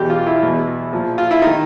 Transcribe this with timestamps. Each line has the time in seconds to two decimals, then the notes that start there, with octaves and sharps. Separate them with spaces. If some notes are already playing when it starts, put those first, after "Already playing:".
Already playing: E2 B2 G4
0.10 F4
0.27 E4
0.43 E2 B2
0.93 A#2 F3
1.18 F4
1.31 E4
1.42 D#3 D#4